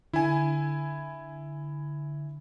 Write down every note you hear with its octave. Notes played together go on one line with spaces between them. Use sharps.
D3 E4 G#5